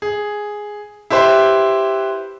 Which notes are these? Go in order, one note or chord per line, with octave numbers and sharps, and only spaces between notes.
G#4
E4 G4 B4 C5